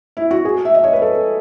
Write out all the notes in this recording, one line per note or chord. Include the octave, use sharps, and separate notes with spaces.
E4
F#4
G#4
E5
D#5
C#5
B4
A4